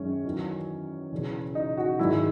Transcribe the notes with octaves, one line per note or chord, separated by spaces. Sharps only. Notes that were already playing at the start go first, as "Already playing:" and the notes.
Already playing: F#2 D#3 G#3 C#4
E2 D#3 F#3
E1 E2 C#3
D#4
F#4
G#1 G#2 D#3 G#3 E4